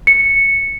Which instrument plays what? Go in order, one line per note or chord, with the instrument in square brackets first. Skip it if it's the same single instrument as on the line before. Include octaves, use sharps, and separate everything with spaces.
[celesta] C#7